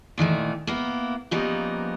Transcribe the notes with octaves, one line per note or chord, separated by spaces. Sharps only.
A#2 D#3 E3 A3
A#3 B3 E4
C#3 F3 G3 A#3 B3 D#4